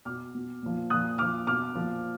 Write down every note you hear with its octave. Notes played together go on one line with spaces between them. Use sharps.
B2 D6 F6
B2
A#2 F3
A#2 F3 D#6 F#6
A#2 F3 D6 F6
B2 D6 F6
A#2 F3